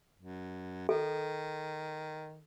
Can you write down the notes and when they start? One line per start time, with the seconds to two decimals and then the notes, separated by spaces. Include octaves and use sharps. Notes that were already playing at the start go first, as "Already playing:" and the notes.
0.17 F#2
0.89 D#3 A4